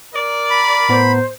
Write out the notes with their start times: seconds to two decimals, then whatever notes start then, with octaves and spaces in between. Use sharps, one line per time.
0.14 A#4 D5
0.50 B5
0.89 A2 B3 C5 A#5